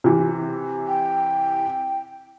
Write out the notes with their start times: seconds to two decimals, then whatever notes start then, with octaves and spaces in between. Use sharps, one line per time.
0.04 C3 E3
0.87 G5